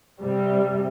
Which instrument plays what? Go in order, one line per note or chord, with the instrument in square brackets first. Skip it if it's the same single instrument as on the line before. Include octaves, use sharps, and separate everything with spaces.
[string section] C3 G3